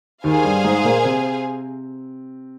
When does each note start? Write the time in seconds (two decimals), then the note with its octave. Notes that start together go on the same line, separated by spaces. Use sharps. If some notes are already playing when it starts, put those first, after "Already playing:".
0.24 D#2 D#3 G#4 C5 F5 G#5
0.44 G2 G3
0.64 G#2 G#3
0.84 A#2 A#3
1.04 C3 C4